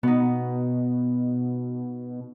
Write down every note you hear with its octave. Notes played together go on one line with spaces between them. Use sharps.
B2 B3 D#4